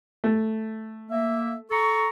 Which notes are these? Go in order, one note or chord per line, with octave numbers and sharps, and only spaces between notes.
A3
A#3 E5
A4 A#5 C#6